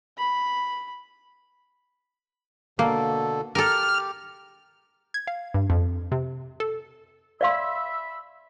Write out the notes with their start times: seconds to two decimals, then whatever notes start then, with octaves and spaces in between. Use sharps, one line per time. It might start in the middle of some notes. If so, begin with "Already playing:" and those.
0.18 B5
2.79 B2 D3 A#3 A4
3.55 G4 A4 A#4 F6
5.14 G#6
5.27 F5
5.54 G2
5.70 F2
6.12 C3
6.60 A4
7.41 D5 E5 F5 B5 C6 E6